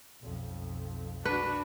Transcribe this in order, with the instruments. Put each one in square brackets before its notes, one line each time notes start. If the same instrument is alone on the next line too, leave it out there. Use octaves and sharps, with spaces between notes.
[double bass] B1 F2
[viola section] D4 F#4 [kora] B4